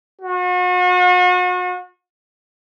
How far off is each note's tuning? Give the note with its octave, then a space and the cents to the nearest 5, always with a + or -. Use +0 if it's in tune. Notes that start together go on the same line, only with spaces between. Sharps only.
F#4 -40